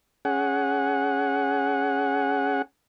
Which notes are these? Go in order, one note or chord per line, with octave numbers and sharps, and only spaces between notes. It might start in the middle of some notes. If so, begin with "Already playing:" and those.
C#4 G#4 F#5